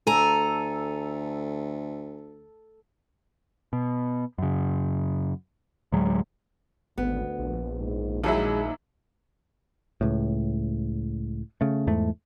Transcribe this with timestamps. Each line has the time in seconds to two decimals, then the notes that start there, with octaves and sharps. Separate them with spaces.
0.07 D2 A4 G#5 A#5
3.73 B2
4.38 F#2 C#3
5.92 D2 A2 F#3 G#3
6.98 G#1 D2 B3
7.39 A#1
7.78 G#2
8.24 D#2 F#3 G#3 D#4 E4
10.01 C#2 A2
11.61 C#3 A3
11.87 E2 G#2 A3